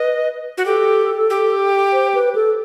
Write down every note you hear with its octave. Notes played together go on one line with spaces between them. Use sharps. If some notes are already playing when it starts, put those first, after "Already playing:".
Already playing: B4 D#5
F#4
G4 A4
G4
C5
B4
A4